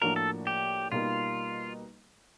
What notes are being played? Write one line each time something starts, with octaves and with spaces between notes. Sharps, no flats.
A2 F3 A#3 D4 F#4 A#4
A4
G4
B2 G3 A#3 D#4 F4